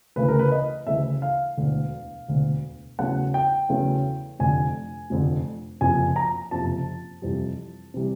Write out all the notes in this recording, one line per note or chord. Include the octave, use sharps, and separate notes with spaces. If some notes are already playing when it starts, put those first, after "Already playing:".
D2 C#3 E3 A3 B4
A#4
B4
D#5
D2 C#3 E3 A3 E5
F5
E1 D2 D3
E1 D2 D3
E2 C#3 F#3 A3 C#4 F#5
G5
E2 C#3 F#3 A3 C#4
F1 F2 D3 G#5
F1 F2 D3
F#1 F2 C3 F3 G#5
A#5
F#1 F2 C3 F3 A5
F2 C3 E3 G3
C3 E3 G3